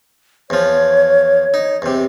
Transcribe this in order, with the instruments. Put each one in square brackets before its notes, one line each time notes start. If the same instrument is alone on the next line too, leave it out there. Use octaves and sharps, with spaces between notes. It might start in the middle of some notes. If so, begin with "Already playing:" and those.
[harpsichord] E2 F3 [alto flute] C#5
[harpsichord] D#4
E2 C3